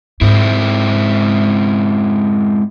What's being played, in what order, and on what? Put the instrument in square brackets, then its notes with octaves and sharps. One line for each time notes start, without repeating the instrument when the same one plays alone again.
[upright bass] G#2 [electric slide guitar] G#3 C4 E4